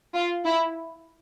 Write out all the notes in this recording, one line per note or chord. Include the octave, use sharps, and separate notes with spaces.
F4
E4